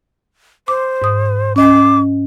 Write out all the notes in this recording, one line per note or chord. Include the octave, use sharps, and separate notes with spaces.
C5 D6
G#2 D#6
C#4 D#5 D6